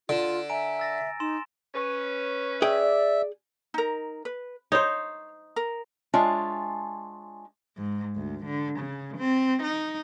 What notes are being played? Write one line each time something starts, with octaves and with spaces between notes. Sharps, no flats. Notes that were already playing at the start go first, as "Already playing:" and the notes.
D3 F4 D7 E7
E5 G#5 A#5 D7
E6 A6 A#6
D#4 C6 E7
C#4 B4
G#4 D5 E5 G5
D#4 A#4
B4
D#4 C5 C#5
A#4
G#3 D4 F4 C#5 E5
G#2
D2
D3
C#3
C4
D#4